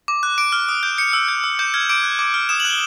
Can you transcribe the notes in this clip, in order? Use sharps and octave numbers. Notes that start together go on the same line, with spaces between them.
D6
F#6
D6 D7
F6
D#6
G6
G6 C#7
E6
G6
E6
D6 G6
F6 G#6
D6 D7
F#6
D6
F6
D#6 E7
F#7
F#6
G7